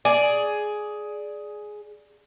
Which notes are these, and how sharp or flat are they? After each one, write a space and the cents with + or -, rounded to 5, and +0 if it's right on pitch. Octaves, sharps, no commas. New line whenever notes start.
G#4 +10 D5 +0